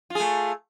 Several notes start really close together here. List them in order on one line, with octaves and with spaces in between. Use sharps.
F4 G#4 A3